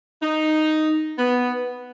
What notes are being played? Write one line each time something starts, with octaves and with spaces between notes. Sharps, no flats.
D#4
B3